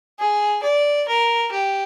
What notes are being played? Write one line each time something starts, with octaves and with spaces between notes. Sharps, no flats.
G#4
D5
A#4
G4